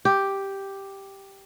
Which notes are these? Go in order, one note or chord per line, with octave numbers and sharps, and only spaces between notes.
G4